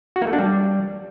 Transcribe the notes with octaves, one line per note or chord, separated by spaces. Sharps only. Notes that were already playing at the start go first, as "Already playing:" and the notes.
F#4
A#3
A3
D4
G3